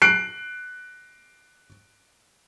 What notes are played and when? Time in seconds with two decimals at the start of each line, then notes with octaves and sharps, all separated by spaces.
0.02 F#6 C7 D7